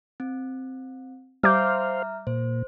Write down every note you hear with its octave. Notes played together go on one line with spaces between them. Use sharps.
C4
G3 C5 E5 F5 A#5 D6 F6 G6
A#2 C5